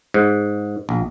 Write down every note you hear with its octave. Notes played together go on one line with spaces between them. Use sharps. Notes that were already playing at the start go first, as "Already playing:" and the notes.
G#2
A#1